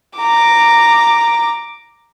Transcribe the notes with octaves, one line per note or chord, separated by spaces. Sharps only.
A#5 D6